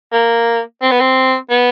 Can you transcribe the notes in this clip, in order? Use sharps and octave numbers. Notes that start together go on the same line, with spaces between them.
A#3
C4
B3
C4
B3